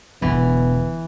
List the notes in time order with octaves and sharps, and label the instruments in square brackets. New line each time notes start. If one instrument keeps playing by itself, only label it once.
[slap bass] E1 D3 [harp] E3 [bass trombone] B3